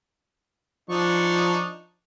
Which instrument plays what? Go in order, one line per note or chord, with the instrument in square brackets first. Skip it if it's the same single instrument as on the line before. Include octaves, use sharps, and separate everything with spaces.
[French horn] F3 [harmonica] D4 D#4 C#6